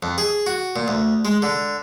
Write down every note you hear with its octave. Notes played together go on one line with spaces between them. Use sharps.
F2
G#4
F#4
A#2
D2
G#3
D3